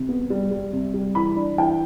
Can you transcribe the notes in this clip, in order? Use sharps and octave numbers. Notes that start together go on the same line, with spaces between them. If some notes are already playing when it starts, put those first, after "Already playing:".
Already playing: C3
B3
G3
G3
C3
G3
E3 B5
D4
E3 G5